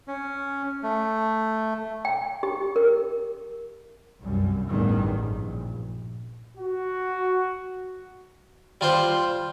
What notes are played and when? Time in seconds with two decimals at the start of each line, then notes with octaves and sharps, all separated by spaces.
0.08 C#4
0.83 A3
2.05 G5
2.43 G4
2.76 A#4
4.20 C2 F#2 G3
4.68 A1 E2 G2 D#3 G3
5.25 A#1
6.57 F#4
8.81 G3 F4 C5